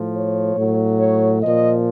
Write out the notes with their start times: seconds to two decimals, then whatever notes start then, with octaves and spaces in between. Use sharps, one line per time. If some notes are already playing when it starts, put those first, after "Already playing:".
Already playing: A2 F3
0.15 C#5
0.56 A2 F#3
0.99 C#5
1.41 A#2 F3 D#5